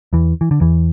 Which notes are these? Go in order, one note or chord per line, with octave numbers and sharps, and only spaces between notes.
E2 E3
E3
D3
E2 E3